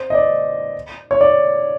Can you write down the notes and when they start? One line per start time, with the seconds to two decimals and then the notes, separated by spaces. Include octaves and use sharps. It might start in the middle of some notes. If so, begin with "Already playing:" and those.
Already playing: C5
0.10 D#5
0.15 D5
1.11 C#5
1.21 D5